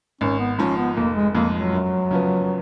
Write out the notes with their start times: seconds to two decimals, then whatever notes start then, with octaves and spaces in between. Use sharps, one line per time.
0.21 G#1 C#4
0.39 B3
0.59 G#2 F3 C#4
0.77 B3
0.97 F1 A#3
1.16 G#3
1.35 F2 F3 G#3 A#3
1.54 F#3
1.73 F#2
2.11 C#3 F3 B3